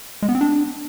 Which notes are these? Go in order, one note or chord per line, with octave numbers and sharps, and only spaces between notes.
G#3
B3
C4
D4